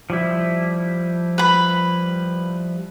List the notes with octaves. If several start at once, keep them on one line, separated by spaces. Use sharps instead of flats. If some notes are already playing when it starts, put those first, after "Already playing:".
F3 G3 E4
B4 B5